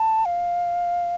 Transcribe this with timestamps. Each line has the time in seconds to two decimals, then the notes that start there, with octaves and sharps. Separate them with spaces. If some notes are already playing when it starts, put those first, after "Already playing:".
Already playing: A5
0.25 F5